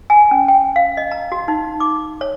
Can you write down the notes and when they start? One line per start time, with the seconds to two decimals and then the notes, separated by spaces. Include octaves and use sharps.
0.10 G#5
0.31 C#4
0.48 G5
0.76 F5
0.97 D#5
1.11 A#5
1.32 F#4
1.48 D#4
1.80 D6
2.21 C#5